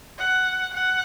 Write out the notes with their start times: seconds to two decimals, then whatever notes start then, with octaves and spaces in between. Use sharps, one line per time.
0.19 F#5
0.74 F#5